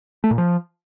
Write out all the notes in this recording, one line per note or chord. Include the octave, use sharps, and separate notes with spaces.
A3
A#2
F3